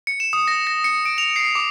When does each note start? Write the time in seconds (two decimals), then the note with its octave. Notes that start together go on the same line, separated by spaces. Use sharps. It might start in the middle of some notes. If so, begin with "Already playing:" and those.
0.07 C#7
0.20 E7
0.33 D#6
0.48 A#6
0.67 A#6
0.84 C#7
1.06 D7
1.18 F7
1.36 C7
1.55 D6